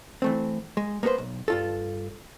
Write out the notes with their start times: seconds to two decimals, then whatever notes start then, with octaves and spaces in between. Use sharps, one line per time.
0.22 E3 A3 C4
0.77 G#3
1.03 A#3 B3 A4 B4 C5
1.18 B1
1.48 G2 F4 A4